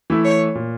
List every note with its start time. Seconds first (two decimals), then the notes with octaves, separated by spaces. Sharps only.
0.10 E3 A3 E4
0.25 C#5
0.55 A#2